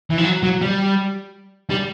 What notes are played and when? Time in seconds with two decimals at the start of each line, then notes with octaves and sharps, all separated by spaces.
0.10 E3
0.18 F3
0.24 F#3
0.43 F#3
0.61 G3
1.70 G3